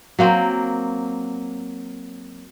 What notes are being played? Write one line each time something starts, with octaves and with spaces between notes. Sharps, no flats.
F#3 A#3 C4